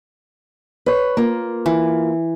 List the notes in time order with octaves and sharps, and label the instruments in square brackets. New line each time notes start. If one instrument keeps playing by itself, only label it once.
[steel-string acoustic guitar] B4 C#5
A#3 F4
[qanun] E3